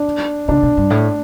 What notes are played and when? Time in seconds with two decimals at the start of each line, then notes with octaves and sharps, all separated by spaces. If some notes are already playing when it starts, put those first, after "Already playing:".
Already playing: D4
0.48 C#3 D4
0.63 B2
0.77 G2
0.90 A2